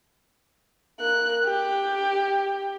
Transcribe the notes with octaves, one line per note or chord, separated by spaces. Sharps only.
A#3 F#6
G4